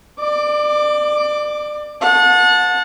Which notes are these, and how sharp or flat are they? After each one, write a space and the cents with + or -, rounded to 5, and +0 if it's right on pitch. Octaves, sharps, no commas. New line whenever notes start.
D5 +30 D6 +0
F#5 -35 A5 +0